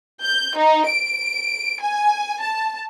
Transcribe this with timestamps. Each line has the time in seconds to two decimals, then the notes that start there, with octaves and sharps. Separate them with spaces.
0.22 G6
0.57 D#4
0.88 D7
1.81 G#5
2.42 A5